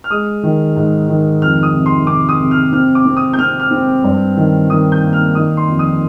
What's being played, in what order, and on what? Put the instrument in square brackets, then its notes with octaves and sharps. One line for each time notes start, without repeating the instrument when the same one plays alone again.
[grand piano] F6
G#3 D#6
D#3
G#2
D#3
F2 F6
D#6
C3
C6
C3 D6
D#6
C3
F6
C4 F6
D6
C4
D#6
G6
C4 F6
F6
C4
G2
D#3
D#3 D#6
G6
A#3
F6
D#3 D#6
C6
F2
D#6